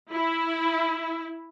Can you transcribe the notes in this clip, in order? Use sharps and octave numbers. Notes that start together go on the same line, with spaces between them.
E4